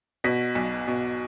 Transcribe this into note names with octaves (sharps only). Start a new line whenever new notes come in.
B2 B6
B1
B2